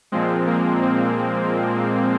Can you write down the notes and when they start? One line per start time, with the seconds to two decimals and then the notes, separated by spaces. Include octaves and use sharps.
0.12 A#2 F3 G#3 C4
0.47 A#3
0.82 C4